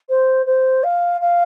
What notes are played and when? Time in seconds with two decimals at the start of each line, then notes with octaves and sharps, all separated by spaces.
0.09 C5
0.46 C5
0.83 F5
1.21 F5